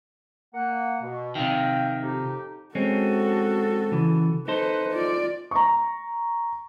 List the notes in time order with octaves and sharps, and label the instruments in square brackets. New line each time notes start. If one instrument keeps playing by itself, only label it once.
[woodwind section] A#3 F#5
B2
[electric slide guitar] C3 D#3 [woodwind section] E5 F5 G5
[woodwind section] F2 D#4 G4
[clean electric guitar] G#3 C4 C#4 [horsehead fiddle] F#4 A4
[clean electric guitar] C#3 E3
[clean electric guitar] D#4 A4 C5 [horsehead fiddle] B4
[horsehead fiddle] F4 D5
[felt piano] A#5 C#6